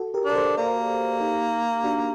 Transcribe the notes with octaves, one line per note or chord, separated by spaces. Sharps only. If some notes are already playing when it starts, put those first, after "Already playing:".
Already playing: F#4 A4
G4 A#4
D4 A#4
A4 C5
A#3 A#4 D5
D#4 G4
D4 F#4